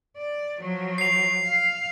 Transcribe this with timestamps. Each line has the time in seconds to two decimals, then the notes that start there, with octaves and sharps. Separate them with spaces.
0.17 D5
0.59 F3 F#3
0.98 C7 F7
1.45 F5